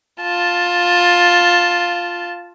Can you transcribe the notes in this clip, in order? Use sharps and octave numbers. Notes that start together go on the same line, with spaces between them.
F4 A5